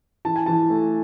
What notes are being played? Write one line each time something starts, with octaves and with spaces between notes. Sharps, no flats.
E3 A5
G#5
E3 A5
A3